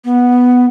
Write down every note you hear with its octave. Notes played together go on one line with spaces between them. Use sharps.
B3